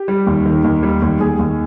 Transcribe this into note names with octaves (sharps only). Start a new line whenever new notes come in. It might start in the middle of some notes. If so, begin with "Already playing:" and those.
Already playing: G4
G3
D#2
D#3
D#2
G3
D#2
D#2 G#4
D#2